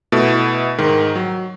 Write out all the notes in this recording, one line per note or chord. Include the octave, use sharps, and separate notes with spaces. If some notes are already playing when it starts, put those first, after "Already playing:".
B2 A3 E4
G#2 D#3
F#3